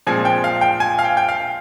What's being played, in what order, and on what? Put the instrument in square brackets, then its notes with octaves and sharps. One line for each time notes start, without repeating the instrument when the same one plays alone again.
[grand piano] A#2 F3 G#3 C4 G#5
G5
F5
G5
G#5
F5
G5
G5
F5